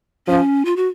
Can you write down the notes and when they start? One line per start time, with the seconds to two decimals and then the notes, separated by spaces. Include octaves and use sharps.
0.27 F3 C#4
0.65 F4
0.76 F#4